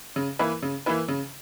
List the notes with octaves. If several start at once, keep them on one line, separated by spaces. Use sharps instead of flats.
C#3
E3 A#3 E4 B4
C#3
E3 A#3 E4 B4
C#3